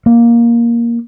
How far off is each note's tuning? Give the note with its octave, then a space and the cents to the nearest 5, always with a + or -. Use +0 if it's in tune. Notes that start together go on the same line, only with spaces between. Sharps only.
A#3 +10